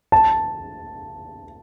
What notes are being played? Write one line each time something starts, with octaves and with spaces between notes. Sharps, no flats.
A5